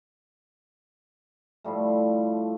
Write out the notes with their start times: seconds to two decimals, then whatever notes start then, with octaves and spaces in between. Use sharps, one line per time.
1.64 A2 F3 G3 A3